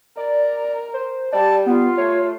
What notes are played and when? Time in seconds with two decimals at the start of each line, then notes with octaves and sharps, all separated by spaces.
0.17 A#4 D5
0.94 C5
1.33 G3 D5 A5
1.66 B3 F4
1.97 A3 C#5